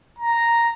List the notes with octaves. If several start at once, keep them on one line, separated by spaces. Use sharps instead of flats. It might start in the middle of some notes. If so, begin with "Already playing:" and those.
A#5